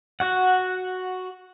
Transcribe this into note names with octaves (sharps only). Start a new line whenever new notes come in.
F#4 F#5